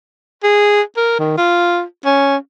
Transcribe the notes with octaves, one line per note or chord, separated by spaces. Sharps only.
G#4
A#4
D#3
F4
C#4